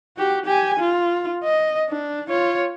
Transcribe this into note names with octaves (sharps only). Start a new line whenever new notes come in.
F#4 G4
G4 G#5
F4
D#5
D4
F4 C#5